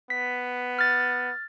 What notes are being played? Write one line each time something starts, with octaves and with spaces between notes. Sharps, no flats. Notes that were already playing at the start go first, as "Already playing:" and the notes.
B3 B6
F6 A6